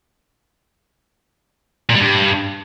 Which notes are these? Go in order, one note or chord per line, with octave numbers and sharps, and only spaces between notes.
A#2
G3
G2